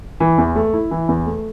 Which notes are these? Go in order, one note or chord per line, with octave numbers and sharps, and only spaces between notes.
E3
E2
A3
E4
E3
E2
A3